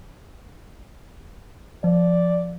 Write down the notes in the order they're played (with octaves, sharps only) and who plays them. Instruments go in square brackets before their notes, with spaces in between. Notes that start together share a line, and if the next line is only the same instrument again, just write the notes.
[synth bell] F3 [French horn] D5